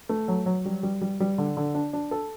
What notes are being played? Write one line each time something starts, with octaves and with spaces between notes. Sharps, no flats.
A3
F#3
F#3
G3
G3
G3
G3
D3
D3
D4
D4
A4